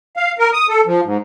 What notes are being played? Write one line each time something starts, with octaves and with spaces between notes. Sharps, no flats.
F5
A#4
D#6
A4
F3
G#2